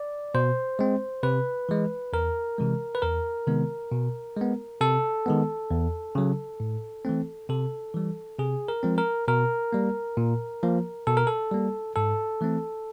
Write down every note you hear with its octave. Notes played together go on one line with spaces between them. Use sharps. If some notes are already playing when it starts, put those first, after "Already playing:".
Already playing: D5
B2 C5
G#3 C4
C3 B4
E3 G#3
E2 A#4
C3 E3 G#3
B4
E2 A#4
C3 D#3 G#3 B3
B2
G#3 B3
C3 A4
D#3 G#3 B3
E2
C#3 F#3
A2
E3 A3 C4
C3 A4
E3 G3
C3 G#4
A#4
F3 G#3 C4
A#4
B2 A#4
G3 A#3
A#2
F3 A#3
B2 A4
A#4
A4
G3 A#3
G#2 A4
E3 A3 C4